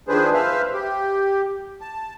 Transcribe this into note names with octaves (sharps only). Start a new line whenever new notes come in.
D#3 F3 D4 G#4 B4 C5
B4 C5 E5 F5
G4
A5